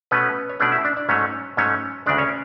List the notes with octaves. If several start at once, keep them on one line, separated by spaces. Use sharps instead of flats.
B2 A3 B3 C#4 B4
C#5
B2 A3 C#4 D4 D5
E4 E5
D4 D5
D4 D5
G#2 F#3 A3 C#4 C#5
G#2 F#3 A3 C#4 C#5
D2 C#3 G#3 D4 D5
C#4 C#5